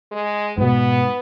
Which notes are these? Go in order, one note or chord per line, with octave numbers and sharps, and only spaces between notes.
G#3
G#2 B2 B3